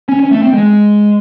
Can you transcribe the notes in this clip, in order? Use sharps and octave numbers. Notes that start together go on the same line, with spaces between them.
C#4
C#4
A3
C4
G#3